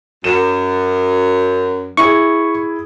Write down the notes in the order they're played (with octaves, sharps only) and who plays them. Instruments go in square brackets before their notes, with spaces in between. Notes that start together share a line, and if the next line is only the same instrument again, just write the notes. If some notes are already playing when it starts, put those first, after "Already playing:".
[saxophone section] F#2 [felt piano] E7
[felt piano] E4 G#4 [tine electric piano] C#6